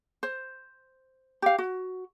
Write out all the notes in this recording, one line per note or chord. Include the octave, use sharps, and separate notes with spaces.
C5
G4 F5
F#4